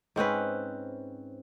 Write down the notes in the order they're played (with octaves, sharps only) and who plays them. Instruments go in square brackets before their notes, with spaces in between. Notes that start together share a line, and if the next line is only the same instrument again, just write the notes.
[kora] G#2 C4 C#4 B4